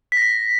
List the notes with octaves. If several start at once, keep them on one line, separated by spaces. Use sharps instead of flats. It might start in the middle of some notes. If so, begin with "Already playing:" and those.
B6
A#6
B6